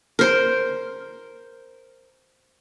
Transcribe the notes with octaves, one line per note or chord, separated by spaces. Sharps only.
A#4 C5